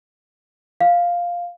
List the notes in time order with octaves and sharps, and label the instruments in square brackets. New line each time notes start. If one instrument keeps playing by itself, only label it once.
[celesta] F5